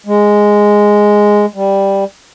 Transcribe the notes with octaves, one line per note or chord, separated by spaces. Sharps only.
G#3
G3